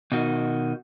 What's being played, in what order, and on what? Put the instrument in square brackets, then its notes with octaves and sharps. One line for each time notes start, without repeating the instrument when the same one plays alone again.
[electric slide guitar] B2 D#3 F#4